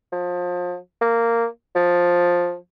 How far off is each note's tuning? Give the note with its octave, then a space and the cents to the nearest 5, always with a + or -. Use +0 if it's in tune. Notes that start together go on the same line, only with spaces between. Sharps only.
F3 +30
A#3 -10
F3 +10